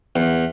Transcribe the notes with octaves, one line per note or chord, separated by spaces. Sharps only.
E2